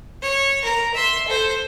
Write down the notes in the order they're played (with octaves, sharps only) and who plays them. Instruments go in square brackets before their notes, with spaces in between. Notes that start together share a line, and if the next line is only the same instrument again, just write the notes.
[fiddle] C#5
A#4 A#5
E5 C6
A4 C5